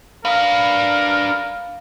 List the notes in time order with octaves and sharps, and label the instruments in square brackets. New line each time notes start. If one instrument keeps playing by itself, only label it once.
[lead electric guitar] D4 B4 [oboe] A#4 [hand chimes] F5 D#6